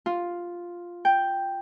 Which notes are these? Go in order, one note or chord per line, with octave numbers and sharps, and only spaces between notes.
F4
G5